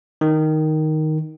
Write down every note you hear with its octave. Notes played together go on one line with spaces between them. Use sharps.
D#3